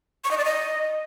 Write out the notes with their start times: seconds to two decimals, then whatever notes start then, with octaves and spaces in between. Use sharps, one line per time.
0.24 C#6
0.31 D#5
0.38 D5
0.44 D#5